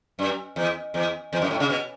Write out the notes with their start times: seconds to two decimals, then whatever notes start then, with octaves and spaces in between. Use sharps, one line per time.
0.19 F#2
0.56 E2
0.94 E2
1.33 E2
1.42 F#2
1.51 A2
1.60 C#3
1.70 B2